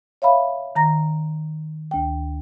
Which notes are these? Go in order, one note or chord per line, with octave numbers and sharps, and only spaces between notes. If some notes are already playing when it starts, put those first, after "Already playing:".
C#5 E5 F5 B5
D#3 A#5 A#6
D2 G5